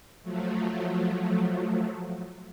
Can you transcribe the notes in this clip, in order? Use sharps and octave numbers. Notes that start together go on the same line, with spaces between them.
F3 F#3 A3